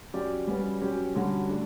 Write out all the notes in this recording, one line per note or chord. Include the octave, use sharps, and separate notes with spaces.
F#3 C#4 G4 D5
G3 C#4 F#4 B4
F#3 C#4 G4
D3 G3 C#4 F#4
A3 D4